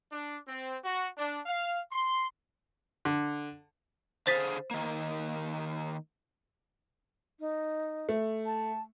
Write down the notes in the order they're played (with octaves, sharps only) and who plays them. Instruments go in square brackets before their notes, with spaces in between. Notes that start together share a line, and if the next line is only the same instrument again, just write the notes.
[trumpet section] D4
C4
F#4
D4
F5
C6
[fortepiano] D3
[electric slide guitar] D3 G#4 F5 [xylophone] C5 A6 B6
[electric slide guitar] D#3 A#3
[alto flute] D#4
[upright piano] A3
[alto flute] A5